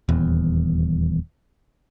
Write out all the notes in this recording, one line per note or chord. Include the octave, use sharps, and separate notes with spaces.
D#1 E2